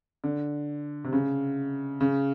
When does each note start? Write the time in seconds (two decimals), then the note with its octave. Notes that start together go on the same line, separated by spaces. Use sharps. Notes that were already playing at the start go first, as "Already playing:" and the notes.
0.24 D3
1.04 C3
1.13 C#3
2.01 C#3